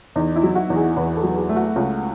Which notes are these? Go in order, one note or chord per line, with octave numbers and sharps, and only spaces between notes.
E2 D#4
E4
F#3
F#4
E2
G#4
E2 B4
A4
F#3
G#4
A3
F#4
C#2